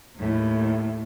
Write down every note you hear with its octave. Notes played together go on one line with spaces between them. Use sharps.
D#2 A2